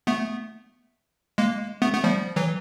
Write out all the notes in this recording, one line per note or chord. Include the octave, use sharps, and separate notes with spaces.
A3 B3
G#3 A#3
A3 B3
A3 B3
F3 G3
E3 F#3